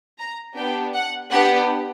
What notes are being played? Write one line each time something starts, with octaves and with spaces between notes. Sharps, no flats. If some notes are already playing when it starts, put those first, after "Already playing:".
A#5
B3 D4 G4 G5
F#5
B3 D4 G4 F#5